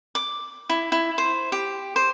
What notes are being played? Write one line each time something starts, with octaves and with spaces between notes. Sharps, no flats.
D6
E4
E4
C5
G4
C5